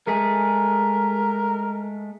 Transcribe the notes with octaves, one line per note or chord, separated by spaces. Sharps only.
G#3 A3 G#4 A#4